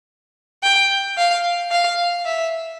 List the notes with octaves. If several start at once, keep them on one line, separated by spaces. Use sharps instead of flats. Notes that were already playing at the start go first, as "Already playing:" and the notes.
G5
F5
F5
E5